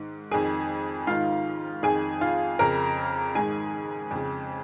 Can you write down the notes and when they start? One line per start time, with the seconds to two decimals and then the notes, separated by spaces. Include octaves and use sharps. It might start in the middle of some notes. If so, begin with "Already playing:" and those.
Already playing: G#2 D#3
0.31 F2 D#3 G#4 G#5
1.07 G#2 D#3 F4 F5
1.83 F2 D#3 G#4 G#5
2.21 F4 F5
2.59 F2 C#3 A#4 A#5
3.35 G#2 D#3 G#4 G#5
4.11 F2 C#3